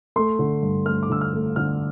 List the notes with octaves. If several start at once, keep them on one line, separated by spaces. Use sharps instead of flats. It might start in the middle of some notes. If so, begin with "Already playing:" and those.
A3 C6
D3
G2
A3 F6
D6
D3 E6
F6
A3
D3 F6